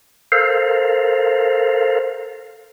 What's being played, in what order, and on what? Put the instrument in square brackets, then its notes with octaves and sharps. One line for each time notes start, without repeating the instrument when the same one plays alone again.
[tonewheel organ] A4 A#4 C5 F5